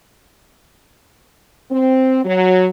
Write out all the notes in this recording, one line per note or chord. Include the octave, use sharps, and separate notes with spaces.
C4
F#3